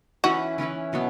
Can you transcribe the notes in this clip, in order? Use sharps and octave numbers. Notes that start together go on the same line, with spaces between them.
E3 C#4 E4 F#4 B4
E3 C#4 E4 B4
B2 F#3 B3